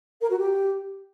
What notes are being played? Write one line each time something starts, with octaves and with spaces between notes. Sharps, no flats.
A#4
F#4
G4